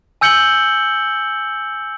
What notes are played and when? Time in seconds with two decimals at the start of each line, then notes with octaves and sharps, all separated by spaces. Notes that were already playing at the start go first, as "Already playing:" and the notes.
0.21 G#5 E6 G6 C#7 F#7 G7